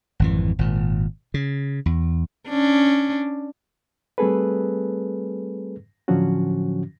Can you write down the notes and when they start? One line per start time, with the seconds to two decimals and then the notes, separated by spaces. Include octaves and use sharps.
0.20 G#1 F2 E3
0.59 G#1 A#2
1.34 C#3
1.86 E2
2.49 C#4 D4
4.18 G3 A3 C4 G#4 A4 B4
6.08 A2 D3 F3 F#3 C#4 F#4